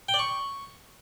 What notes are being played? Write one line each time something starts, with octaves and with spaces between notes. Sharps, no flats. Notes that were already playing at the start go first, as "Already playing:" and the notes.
G5
D5
C#6